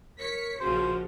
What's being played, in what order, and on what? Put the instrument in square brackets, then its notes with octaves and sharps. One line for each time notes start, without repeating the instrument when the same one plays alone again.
[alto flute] A#4 [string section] C#5 B6 C#7
[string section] A#1 C#3 F3 [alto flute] F#4 [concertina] C5